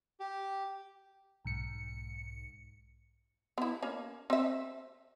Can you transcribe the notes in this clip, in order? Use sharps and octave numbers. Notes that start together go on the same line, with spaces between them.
G4
B1 G#2 C#7
B3 E4
A#3 C#4
C4 E5